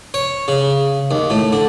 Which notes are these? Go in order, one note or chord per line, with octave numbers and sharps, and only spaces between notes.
C#5
C#3
D#2
A2
D3